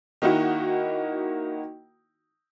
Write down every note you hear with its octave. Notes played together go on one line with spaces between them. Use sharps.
D#3 A#3 D#4 E4 F#4